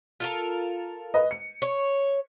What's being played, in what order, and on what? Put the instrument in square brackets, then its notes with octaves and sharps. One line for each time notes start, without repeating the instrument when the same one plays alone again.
[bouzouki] F4 A4 A#4
[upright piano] B4 D#5
C#7
[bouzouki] C#5